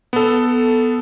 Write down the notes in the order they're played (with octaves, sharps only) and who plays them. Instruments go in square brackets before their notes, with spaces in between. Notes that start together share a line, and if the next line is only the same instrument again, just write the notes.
[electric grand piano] B3 A4